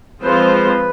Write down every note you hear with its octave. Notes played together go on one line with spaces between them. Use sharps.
F3 G#3 C4 F4 B4 C5